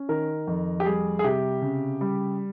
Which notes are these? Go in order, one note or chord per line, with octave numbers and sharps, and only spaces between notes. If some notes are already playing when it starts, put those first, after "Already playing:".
Already playing: C#4
D#3 A#4
F2
G4
G3 G#4
G#4
C3 G4
C#3
G3